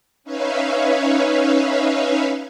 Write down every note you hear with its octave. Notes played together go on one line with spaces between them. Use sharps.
C#4 D#4 B4 C#5 E5 F5